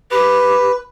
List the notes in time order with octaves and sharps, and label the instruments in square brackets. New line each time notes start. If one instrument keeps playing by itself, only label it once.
[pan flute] G4 [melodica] B4